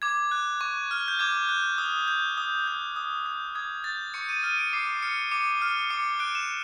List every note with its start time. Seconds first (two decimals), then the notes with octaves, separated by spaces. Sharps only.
0.02 D6 G#6
0.32 F#6
0.61 C#6
0.91 F6
1.08 G6
1.19 D6 G#6
1.49 F#6
1.78 D#6
2.08 G6
2.38 D#6
2.67 G6
2.96 D#6
3.26 G6
3.55 D#6 G#6
3.84 G6 A6
4.14 C#6 C#7
4.29 D#7
4.43 F6 D#7
4.58 D7
4.73 D6 C7
5.03 F6 C#7
5.31 D6 C#7
5.62 F6
5.90 D6 C#7
6.20 F#6 D7
6.35 E7